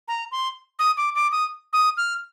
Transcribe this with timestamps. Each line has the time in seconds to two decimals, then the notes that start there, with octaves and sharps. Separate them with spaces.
0.08 A#5
0.32 C6
0.79 D#6
0.97 D6
1.15 D6
1.32 D#6
1.73 D#6
1.97 F6